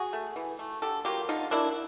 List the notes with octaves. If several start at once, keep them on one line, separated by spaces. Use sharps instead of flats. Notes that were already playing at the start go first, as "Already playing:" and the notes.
Already playing: F#4 G#4
A3
E3
A3
D3 G4 A4
F#3 A#3 F4 G4
D3 D#4 F4
F#3 A#3 D4 E4